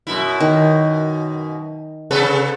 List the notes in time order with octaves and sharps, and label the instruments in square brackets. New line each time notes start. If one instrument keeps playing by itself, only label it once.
[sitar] F#2 B2 E4
[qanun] D#3
[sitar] C3 A4 B4